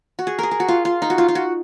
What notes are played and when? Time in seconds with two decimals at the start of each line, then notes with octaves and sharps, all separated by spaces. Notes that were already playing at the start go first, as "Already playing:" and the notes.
0.19 F#4
0.27 G#4
0.39 G#4 A#4
0.51 G#4
0.60 F#4
0.68 F4
0.85 F4
1.02 D#4
1.10 F#4
1.18 F4
1.28 F4
1.35 F#4